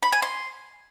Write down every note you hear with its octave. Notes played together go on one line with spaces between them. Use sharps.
B5
G#5
C6